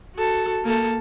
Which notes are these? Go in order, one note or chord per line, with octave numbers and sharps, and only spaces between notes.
F#4 A4
A#3 A4